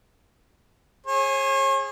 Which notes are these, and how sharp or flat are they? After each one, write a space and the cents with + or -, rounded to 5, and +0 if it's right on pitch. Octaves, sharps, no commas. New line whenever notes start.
G#4 +0 C#5 -40